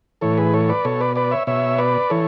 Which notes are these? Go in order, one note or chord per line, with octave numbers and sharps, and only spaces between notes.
A2 E3 A4 C#5
G#4 B4
A4 C#5
B4 D5
B2 A4 C#5
B4 D5
B4 D5
C#5 E5
B2 C#5 E5
B4 D5
E3 A4 C#5